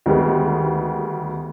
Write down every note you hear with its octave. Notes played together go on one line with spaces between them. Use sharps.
D2 D#3 G3 G#3 B3